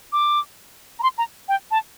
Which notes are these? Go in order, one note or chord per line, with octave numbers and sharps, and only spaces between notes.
D6
A#5
C6
A#5
G5
A5